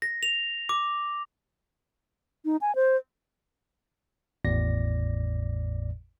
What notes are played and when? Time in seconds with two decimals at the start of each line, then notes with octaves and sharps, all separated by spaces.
0.02 A#6
0.23 F7
0.69 D6
2.45 D#4
2.61 G#5
2.75 C5
4.45 G#1 E2 A2 D5 A#6